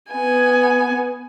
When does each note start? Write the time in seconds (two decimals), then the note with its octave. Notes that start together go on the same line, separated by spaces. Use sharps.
0.10 B3 G#5